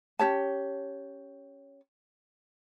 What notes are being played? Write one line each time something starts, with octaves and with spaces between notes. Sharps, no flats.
C#4 G4 C#5 A5